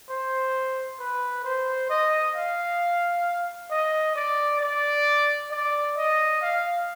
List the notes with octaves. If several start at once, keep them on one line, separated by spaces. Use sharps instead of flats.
C5
B4
C5
D#5
F5
D#5
D5
D5
D5
D#5
F5